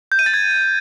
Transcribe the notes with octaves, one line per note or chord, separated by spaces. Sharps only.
G6
D#7
A6
G#6